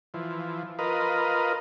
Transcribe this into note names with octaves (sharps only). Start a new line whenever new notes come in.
E3 F3
F4 A#4 B4 D#5